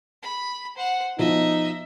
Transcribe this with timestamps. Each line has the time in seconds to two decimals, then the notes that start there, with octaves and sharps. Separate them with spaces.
0.22 B5
0.76 C5 F#5
1.18 B2 F3 D#4 D#5 E5